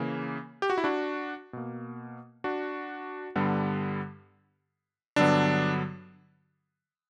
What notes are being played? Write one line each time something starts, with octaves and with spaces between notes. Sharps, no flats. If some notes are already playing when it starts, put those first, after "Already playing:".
Already playing: C#3 E3 A#3
G4
F#4
E4
D4 F#4
B2 A#3
D4 F#4
G2 D3 G3 B3
G2 D3 F#3 B3 D4